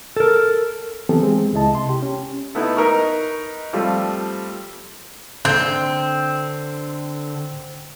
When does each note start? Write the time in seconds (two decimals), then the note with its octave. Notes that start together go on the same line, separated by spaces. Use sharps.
0.17 A4 A#4
1.09 E3 F#3 B3 C4 G4 A4
1.23 G#3 C4 G#4
1.53 C#2 G#3 E4 D#5 A5
1.73 C3 C6
1.89 G4
2.03 C#4
2.55 A3 B3 D#4 E4
2.77 D#4 A#4 B4 A#5 C#6
3.73 F3 G3 A3 C4 F4
5.45 D3 C4 G6